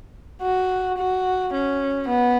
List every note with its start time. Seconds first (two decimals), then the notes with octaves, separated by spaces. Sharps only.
0.42 F#4
0.98 F#4
1.53 C#4
2.09 B3